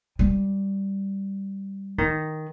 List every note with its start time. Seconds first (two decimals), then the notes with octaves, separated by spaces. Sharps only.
0.19 G3
1.98 D#3